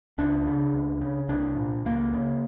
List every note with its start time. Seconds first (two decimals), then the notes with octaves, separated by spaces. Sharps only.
0.18 C#2 D4
0.46 C#3
0.73 C#2
1.01 C#3
1.29 C2 D4
1.57 A#2
1.85 C#2 A#3
2.13 C#3